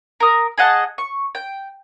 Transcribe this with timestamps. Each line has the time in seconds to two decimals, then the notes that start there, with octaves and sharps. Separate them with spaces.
0.20 A#4 D#6
0.58 G#4 D#5 F#5 A5
0.98 C#6
1.35 G5